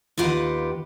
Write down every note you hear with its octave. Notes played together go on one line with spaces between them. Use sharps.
D#2 F4 G4 B4 F#5